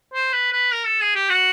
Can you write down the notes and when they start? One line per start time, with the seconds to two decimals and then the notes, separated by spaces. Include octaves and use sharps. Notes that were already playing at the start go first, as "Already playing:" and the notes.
0.14 C5
0.33 B4
0.53 B4
0.72 A#4
0.87 A4
1.01 G#4
1.15 G4
1.29 F#4